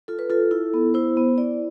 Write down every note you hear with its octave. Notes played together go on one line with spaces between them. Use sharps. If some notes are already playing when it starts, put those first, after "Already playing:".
F4 A4
B4
F4 A4
E4
B3
E4 C5
B3
E4 D5